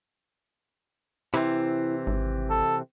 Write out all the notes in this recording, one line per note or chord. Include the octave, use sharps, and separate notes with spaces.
C3 E3 C4 E4
G#1
A4